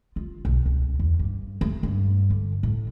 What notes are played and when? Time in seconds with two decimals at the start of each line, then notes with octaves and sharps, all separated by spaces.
0.16 F4
0.45 B1
0.66 C#2
0.99 E2
1.19 G2
1.61 A3
1.83 G2
2.30 D3
2.63 A2